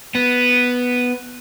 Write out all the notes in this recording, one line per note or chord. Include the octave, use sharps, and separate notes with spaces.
B3